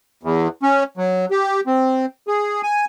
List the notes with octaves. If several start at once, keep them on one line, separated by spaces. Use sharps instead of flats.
E2
C#4
F#3
G4
C4
G#4
G#5